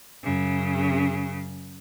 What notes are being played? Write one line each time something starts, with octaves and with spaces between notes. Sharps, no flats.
F#2 C#3